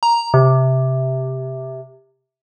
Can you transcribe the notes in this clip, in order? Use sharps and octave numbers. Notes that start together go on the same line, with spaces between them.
A#5
C3